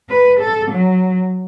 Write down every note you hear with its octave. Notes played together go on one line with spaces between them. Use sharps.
B4
A4
F#3